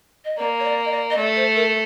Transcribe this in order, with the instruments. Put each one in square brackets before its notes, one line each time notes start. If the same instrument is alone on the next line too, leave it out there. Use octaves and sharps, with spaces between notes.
[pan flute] D#5
[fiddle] A#3 [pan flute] D5
[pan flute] C#5
D5
D#5
D5
D#5
[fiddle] A3 [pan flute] D5
[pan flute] C5
A#4